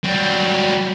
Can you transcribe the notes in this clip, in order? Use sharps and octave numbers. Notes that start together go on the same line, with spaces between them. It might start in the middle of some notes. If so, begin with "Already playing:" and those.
F#3 G3